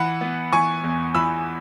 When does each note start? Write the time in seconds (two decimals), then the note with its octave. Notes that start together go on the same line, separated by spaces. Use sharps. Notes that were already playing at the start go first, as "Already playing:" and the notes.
Already playing: E3 F#5 B5
0.21 B3
0.52 E3 G#5 C#6
0.84 E2
1.15 E3 B5 E6